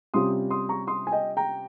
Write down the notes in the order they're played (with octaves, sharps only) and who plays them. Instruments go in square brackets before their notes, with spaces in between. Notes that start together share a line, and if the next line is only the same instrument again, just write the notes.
[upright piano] C3 G3 C#4 F4 C6 D#6
C6 D#6
A#5 C#6
C6 D#6
G#5
D#5 G5
G5 A#5